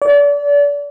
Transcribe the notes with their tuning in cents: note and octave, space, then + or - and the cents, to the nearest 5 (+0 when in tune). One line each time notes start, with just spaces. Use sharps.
D5 -35